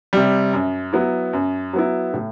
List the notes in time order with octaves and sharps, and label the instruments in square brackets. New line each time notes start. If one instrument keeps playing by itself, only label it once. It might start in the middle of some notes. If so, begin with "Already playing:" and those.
[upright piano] C3 G3
F#2
F#3 B3 E4
F#2
F#3 B3 E4
A2